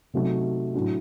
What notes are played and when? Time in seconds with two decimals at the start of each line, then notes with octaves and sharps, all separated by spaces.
0.14 C3 F#3 A3 D#4 F#4
0.74 A2 F#3 A3 D4 F#4